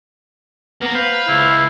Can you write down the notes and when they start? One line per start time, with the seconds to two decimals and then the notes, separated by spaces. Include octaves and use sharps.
0.81 A#3 B3 A#4
0.95 B4 C5 F5
1.29 C#2 E4